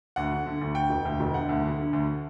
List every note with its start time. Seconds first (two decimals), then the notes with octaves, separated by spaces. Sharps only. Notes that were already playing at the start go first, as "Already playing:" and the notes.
0.16 D2 F#5
0.31 D3
0.46 D3
0.61 D2
0.75 D2 G5
0.90 E1
1.05 D2
1.20 E1
1.34 D3 F#5
1.49 D2
1.64 D3
1.78 D3
1.93 D2